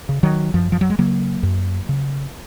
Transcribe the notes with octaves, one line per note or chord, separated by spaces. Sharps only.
C#3
D#3 F#3
F#2 F3
F3
F#3
G#3
C#3 F#3 A#3
F#2
C#3